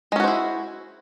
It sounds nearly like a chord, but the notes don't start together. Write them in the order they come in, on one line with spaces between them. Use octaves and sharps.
G#3 C#4 F#4 C5 E4